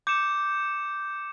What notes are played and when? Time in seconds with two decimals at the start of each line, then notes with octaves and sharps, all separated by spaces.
0.07 D6 G6 C#7 E7